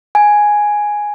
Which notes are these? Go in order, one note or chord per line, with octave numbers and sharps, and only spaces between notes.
G#5